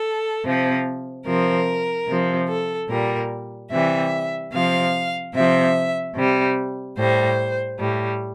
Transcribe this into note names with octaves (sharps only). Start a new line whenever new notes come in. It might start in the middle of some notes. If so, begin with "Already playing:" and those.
Already playing: A4
C3 F3
C3 F3 A#4
C3 F3
A4
A#2 G3 A#4
C3 E3 G3 E5
C3 F3 F5
C3 F3 E5
C3 G3
A2 G3 C5
A2 G3